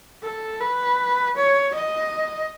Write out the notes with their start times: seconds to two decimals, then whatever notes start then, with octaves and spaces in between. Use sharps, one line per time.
0.23 A4
0.60 B4
1.36 C#5
1.74 D#5